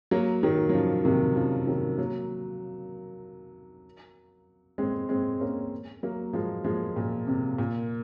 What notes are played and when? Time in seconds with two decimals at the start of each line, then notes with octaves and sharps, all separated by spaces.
0.11 F#3 A#3
0.43 D#3 F#3
0.69 F#3
0.74 C#3 F3
1.05 C3 D#3
1.36 C#3 F3
1.67 D#3 F#3
1.98 F#3 A#3
4.78 G#3 C4
5.09 G#3 C4
5.40 A#3 C#4
6.03 F#3 A#3
6.33 F3 G#3
6.65 F3 G#3
6.96 A#2
7.27 C3
7.58 A#2